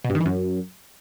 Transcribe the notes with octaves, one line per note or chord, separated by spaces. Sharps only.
B2
G2
D#3
E3
F#2